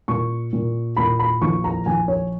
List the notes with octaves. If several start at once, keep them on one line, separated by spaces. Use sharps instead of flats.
A#2 C#6
A#2
A#2 B5
B5
A#1 C#6
A#5
A#1 G#5
C#5